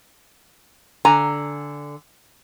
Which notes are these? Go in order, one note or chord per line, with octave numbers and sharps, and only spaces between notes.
D3 G#5 A#5